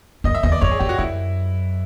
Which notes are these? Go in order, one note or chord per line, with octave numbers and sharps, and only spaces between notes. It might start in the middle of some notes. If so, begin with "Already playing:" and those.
F#2 D#5
E5
E2 D#5
D5
F2 C#5
G#4
F#2 G4
F#4
F#2 E4